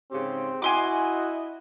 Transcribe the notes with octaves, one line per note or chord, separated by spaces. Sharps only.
G#2 C#3 C4 G4
E4 F#4 D#5 G#5 C6 D6